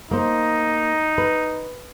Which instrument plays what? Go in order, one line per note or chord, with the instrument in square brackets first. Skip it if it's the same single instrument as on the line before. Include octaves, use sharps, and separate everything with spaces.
[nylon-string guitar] A#3 C5 [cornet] D#4
[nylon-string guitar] B4